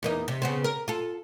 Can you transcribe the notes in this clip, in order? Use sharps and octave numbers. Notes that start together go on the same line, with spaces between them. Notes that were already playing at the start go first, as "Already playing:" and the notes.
E2 A#3 D#4
C3
C#3 B3 C4
A#4
F4 A4